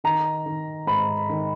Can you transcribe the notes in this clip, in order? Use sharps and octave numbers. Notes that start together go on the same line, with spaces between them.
D#3 A#5
D#3
G#2 B5
D#3